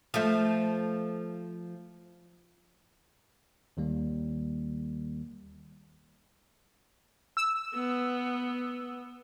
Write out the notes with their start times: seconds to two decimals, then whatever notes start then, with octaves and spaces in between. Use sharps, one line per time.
0.14 F3 A3
3.77 D#2 D#3 G3 A#3
7.37 E6
7.74 B3